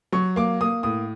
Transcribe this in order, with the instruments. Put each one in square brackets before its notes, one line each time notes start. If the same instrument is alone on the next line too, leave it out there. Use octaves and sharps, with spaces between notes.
[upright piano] F#3 C#6
A#3 D6
A#3 D#6
A2 D#6